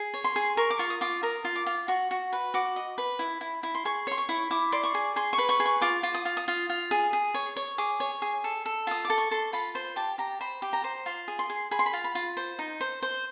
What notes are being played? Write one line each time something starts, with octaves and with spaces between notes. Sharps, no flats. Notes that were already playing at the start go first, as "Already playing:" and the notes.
Already playing: G#4
C#5
C6
G#4
A#4 C#6
D6
F4 C#6
D#6
F4 D6
A#4 D#6
F4
D6
F4
F#4 C#6
F#4
B4
F#4 D6
D#5
B4
E4
E4
E4
C6
G#4 C#6
C#5 C6
C#6
E4
E4 D6
D5 C6
C#6
G#4
G#4 C6
C#6
B4
C#6
G#4
C#6
F4 D6
F4
D#6
F4
D#6
F4
F4
G#4
G#4
C#5
C#5
G#4 D6
C#5
G#4
A4
A4
F4 D#6
D6
A4
C#6
A4 C6
F4 B5
C5
G4 A5
G4 A#5
C5 B5
G4
A#5
C5
F4 C6
G#4
C6
G#4
G#4 B5
C6
B5
F4
B5
F4
C5
D#4
C5
C5